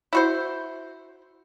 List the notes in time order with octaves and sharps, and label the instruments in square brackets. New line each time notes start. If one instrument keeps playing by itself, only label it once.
[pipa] E4 F#4 C5